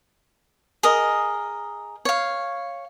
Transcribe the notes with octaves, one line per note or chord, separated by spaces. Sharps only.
G#4 A#4 D#5
C#5 F5